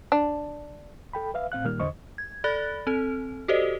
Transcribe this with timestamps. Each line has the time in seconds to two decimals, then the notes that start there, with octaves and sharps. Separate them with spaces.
0.12 D4
1.13 A4 G5 B5
1.34 B4 E5 F5
1.52 A2 C4 F5 F#6
1.65 A#2 D#3 G3 A#3 F6
1.80 E2 D3 C5 D#5 C#6
2.18 G#6
2.44 A4 D5 B5 F#6 A6
2.87 C4 A4
3.48 F#4 G4 A4 C5 D5 D#5